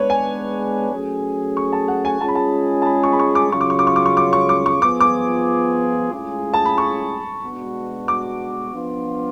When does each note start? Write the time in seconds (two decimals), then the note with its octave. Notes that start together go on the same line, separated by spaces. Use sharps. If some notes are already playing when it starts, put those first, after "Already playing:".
Already playing: G#3 B3 D4 B4 C#5
0.10 G#5
0.91 F#3 A3 C#4 G#4
1.57 C#6
1.73 A5
1.88 F#5
2.05 G#5
2.21 G#3 C#4 F4 G#4 A5
2.28 B5
2.35 A5
2.82 A5
2.86 B5
3.03 C#6
3.13 B5
3.19 C#6
3.35 D6
3.52 C#3 F#3 C#4 F4 C#6
3.61 D6
3.70 C#6
3.79 D6
3.87 C#6
3.96 D6
4.06 C#6
4.17 D6
4.33 C#6
4.49 D6
4.66 C#6
4.82 F3 B3 F4 G#4 D6
5.00 D6
6.12 A2 G#3 C#4 F4 G#4
6.54 A5
6.65 B5
6.78 C#6
7.43 B2 G#3 B3 D4 F#4
8.08 D6
8.74 F3 B3 D4 F4